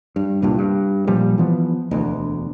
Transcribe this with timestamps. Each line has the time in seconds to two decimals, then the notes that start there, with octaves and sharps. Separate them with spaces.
0.16 G2
0.42 C2 G2 A#2
0.59 G2
1.07 A#2 F3 G3
1.38 E3 F3 B3
1.91 E1 D2